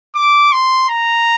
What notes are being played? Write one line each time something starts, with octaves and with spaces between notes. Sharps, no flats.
D6
C6
A#5